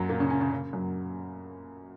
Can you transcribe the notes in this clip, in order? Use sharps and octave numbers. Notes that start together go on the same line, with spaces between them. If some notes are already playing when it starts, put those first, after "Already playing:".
Already playing: F#2 F#3
A#2 A#3
C#3 C#4
C#3 C#4
C#3 C#4
C#3 C#4
F#2 F#3